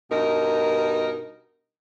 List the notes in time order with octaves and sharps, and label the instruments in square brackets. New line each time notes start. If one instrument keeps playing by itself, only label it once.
[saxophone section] G2 B2 D#4 A#4